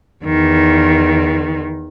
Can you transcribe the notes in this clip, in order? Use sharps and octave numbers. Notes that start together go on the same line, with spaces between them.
E2 D#3